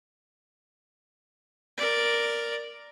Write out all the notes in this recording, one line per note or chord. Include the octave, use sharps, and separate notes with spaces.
A#4 D5